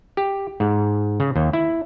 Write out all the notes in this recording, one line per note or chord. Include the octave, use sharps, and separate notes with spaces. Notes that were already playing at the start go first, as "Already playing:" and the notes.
G4
G#2
C#3
D#2
E4